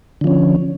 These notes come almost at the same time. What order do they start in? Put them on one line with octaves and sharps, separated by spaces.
D3 F3 C#4